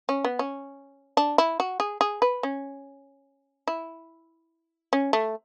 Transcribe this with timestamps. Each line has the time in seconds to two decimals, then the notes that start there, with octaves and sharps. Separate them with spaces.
0.09 C#4
0.24 B3
0.39 C#4
1.17 D4
1.38 E4
1.60 F#4
1.80 G#4
2.01 G#4
2.22 B4
2.43 C#4
3.67 E4
4.93 C#4
5.13 A3